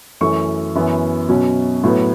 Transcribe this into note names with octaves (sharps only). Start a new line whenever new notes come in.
F#2 E3 A3 C#6
F#2 E3 B3
B2 F#3 C#4
A2 F#3 B3